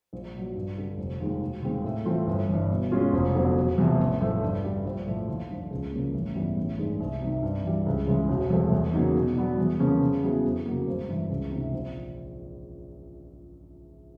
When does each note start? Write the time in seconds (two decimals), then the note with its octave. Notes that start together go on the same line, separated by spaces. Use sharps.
0.13 A#1
0.34 A#2 F#3
0.55 G2
0.77 D3 G3
0.98 F1
1.20 D#2 D#3 G#3
1.42 E1
1.63 D#2 D#3 G#3 C4
1.84 A2
2.05 E3 A3 C4 F4
2.27 G1
2.48 G2 E3
2.70 B2
2.92 G#3 C#4 F4 G#4
3.13 F1
3.35 F2 D3 F#3 B3
3.56 E1
3.78 E2 C3 F3
4.00 A1
4.21 A2 F3 A3
4.43 G2
4.64 D3 G3
4.85 A#1
5.06 A2 F3
5.28 D#2
5.49 D3 F3
5.71 C#2
5.92 C#3 F3 A#3
6.14 A1
6.35 G2 E3 G3 B3
6.57 A1
6.78 G2 D#3 G#3
7.00 C2
7.21 C3 D#3
7.43 G2
7.65 E3 G3
7.86 C#2
8.07 C#3 E3 G#3
8.29 E1
8.50 E2 C3 F3 A3
8.72 E2
8.94 C#3 F#3 A#3 D#4
9.15 B2
9.37 F#3 B3 D4
9.58 E2
9.79 C#3 F3 A#3 C#4
10.01 C#3
10.23 F#3 B3 E4 G#4
10.44 F2
10.66 C#3 F#3 A#3
10.88 G#1
11.08 G2 E3
11.29 C#2
11.51 C3 D#3
11.73 A#1